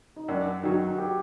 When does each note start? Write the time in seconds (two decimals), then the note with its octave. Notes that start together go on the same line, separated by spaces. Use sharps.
0.16 D#4
0.28 F#2 D4
0.63 D#3 F#3 F#4
0.98 G4